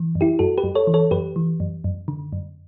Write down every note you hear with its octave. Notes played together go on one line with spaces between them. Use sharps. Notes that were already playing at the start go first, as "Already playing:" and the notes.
Already playing: E3
F#2
E4 G4
F#2 F#4 A4
G4 B4
F#2
A4 C#5
E3
A4 C#5
F#2 G4 B4
E3
F#2
F#2
D3
F#2